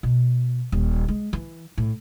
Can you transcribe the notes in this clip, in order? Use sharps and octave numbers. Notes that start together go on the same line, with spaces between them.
B2
D#1
G#3
E3
A2